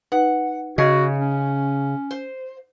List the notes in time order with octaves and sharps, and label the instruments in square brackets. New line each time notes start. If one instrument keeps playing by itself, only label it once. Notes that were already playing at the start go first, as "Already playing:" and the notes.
[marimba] D#4 B4 [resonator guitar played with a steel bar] F#5
[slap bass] C#3 [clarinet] F#4 [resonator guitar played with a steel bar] G#4 [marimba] D#5
[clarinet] C#4
[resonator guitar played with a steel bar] C5